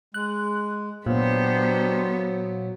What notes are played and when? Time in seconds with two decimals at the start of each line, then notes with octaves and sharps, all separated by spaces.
0.14 G#3 F#6
1.06 A#2 F#3 B3 D4 G4 C5